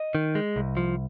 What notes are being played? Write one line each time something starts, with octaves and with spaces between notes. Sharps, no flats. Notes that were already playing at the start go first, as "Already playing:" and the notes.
Already playing: D#5
D#3
G#3
C2
F3